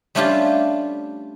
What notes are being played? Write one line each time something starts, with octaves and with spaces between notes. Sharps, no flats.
G3 A3 C#4 D4 F4 G4